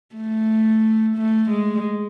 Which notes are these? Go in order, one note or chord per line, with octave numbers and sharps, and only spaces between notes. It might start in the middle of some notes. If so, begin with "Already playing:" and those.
A3
A3
G#3